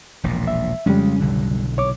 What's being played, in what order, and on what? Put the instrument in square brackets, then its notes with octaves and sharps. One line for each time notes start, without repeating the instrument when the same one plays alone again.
[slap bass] E1 A#1 A#2
[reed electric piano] E5
[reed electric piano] F2 C#3 G3 [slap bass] G#3 C#4
[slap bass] B1 D3
[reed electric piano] C2 C#5 D6